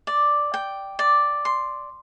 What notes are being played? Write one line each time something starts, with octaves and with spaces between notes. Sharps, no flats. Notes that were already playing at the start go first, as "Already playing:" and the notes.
D5
G5
D5
C6